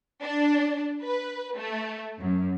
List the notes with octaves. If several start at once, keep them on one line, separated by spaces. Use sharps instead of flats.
D4
B4
A3
F#2